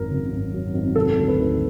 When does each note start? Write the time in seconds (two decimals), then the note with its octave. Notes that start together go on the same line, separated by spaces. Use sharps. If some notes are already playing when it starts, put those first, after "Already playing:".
Already playing: G#1 F#2 A#4
0.10 C#3
0.32 G#1
0.53 F#2
0.74 G#1
0.95 C3 A4
1.17 D2
1.28 B4
1.39 D#3